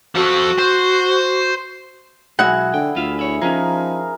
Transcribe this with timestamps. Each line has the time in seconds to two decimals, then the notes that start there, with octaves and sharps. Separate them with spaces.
0.15 F3 F#4 A4
0.59 C5
2.39 B1 G#3 E4 F#4 G#4 F#5
2.74 D3 G5
2.96 D2 F4 E5 F5
3.19 E4 C#5
3.42 F3 C#4 D#4 G#4 A#4